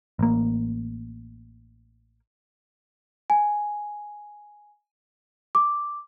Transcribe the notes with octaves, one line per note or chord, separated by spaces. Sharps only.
A1 A#3
G#5
D6